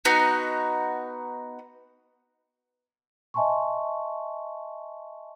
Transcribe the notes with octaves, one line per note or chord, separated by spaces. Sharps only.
B3 D#4 F#4
D#5 E5 G#5 A5 C6 C#6